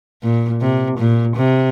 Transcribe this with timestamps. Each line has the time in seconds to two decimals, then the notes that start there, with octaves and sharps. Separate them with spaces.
0.23 A#2
0.61 C3
0.98 A#2
1.36 C3